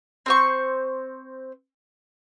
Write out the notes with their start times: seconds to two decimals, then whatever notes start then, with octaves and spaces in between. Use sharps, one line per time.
0.26 C4 C5 C#6